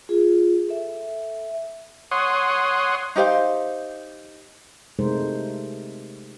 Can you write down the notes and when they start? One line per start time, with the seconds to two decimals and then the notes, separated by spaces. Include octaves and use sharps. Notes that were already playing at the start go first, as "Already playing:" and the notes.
0.09 F4 G#4
0.69 A4 E5
2.11 C#5 F#5 C6 D#6
3.16 D#4 G4 C5 F5
4.99 C3 G#3 A3 D#4 A#4 C5